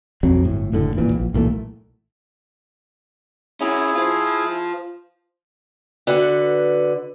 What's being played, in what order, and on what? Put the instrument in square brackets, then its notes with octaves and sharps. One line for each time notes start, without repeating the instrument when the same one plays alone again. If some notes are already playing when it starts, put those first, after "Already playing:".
[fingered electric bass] B1 F2 F#3 C4
G1 A2
F#1 A2 D3
D#1 G#1 A#2 E3
A#1
B1 A#2 E3 A3
[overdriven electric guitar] C#4 F#4 [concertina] E4 G#4
[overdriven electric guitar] F4 C5
[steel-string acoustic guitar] D3 F#4 B4 F#5